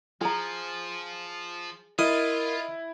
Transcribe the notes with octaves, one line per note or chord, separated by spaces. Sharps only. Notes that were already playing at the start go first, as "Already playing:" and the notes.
F3 G#4 A#5
E4 F4 A#4 D#5 F5